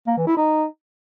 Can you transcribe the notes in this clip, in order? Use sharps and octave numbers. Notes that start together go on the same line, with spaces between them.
A#3
E3
E4
D#4